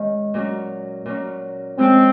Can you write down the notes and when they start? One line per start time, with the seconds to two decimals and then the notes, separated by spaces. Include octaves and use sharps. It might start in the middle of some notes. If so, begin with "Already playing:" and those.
Already playing: D#3 G#3 C#4
0.34 A#2 F#3 C#4
1.06 A#2 F#3 C#4
1.78 F3 G#3 C4 C#4